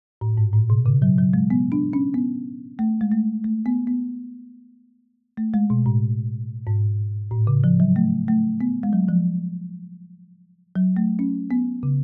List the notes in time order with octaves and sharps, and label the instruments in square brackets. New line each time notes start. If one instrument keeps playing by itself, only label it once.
[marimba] A2
G#2
A2
B2
C#3
F#3
F#3
G#3
B3
D4
C#4
B3
A3
G#3
A3
A3
B3
B3
A3
G#3
B2
A2
G#2
A2
C#3
F3
F#3
A3
A3
B3
G#3
F#3
F3
F#3
A3
C#4
B3
C#3